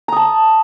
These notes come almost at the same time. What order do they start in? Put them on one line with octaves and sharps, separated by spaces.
A#5 D#6 A5